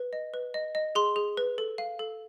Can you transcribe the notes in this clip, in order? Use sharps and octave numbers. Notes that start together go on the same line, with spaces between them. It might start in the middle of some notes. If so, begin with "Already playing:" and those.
Already playing: B4
D#5
B4
D#5
D#5
G#4 C6
G#4
B4
A4
F5
A4